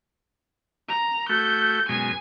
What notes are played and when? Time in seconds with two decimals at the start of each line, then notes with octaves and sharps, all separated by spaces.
0.89 A#5
1.29 A3 F#4 G6
1.89 F#2 B2 G#3 G#5